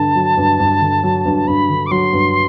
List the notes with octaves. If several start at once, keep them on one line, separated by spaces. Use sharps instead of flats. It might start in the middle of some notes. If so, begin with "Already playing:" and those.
Already playing: G2 D3 A5
F#3
G2
G2
D3
F#3
G2
G2 B5
D3
D6
F#3 C6
G2